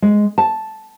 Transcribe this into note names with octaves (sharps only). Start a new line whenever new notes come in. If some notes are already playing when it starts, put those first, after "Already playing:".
G#3
A5